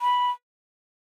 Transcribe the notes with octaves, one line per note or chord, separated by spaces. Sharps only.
B5